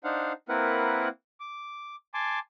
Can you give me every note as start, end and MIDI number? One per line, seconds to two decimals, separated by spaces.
0.04 0.33 62
0.04 0.33 63
0.04 0.33 72
0.04 0.33 77
0.04 0.33 78
0.49 1.08 58
0.49 1.08 60
0.49 1.08 64
0.49 1.08 70
0.49 1.08 71
0.49 1.08 78
1.40 1.96 86
2.14 2.39 80
2.14 2.39 81
2.14 2.39 84
2.14 2.39 86